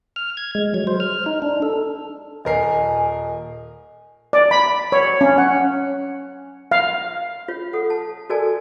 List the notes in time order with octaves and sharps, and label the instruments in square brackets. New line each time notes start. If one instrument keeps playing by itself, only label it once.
[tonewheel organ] F6
G#6
G#3
F#3
C5
F6
D#4
D4
A4
[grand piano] D#1 A#4 C7 [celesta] D#5 [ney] G#5
[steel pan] D5
B5
C#5
C#4
F#5
F5
[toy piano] F4 C#5
A4 F#5 D#6
A5
F#4 A4 A#4 D5 G#5 A5